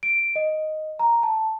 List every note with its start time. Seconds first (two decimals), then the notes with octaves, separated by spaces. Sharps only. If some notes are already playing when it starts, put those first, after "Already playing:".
0.03 D7
0.36 D#5
0.99 A#5
1.23 A5